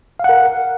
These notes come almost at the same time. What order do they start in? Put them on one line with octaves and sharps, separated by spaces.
F5 F#5 A#4